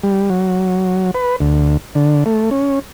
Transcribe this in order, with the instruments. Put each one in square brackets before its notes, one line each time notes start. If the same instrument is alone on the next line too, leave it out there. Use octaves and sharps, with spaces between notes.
[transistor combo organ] G3
F#3
B4
D2
D3
A3
C#4